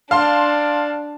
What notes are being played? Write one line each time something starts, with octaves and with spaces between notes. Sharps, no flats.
D4 F5 A5 C6